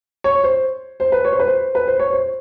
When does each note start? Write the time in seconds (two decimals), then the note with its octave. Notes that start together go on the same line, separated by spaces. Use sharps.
0.24 C#5
0.44 C5
1.00 C5
1.12 B4
1.25 C#5
1.32 C5
1.39 B4
1.47 C5
1.75 B4
1.87 C5
2.00 C#5
2.13 C5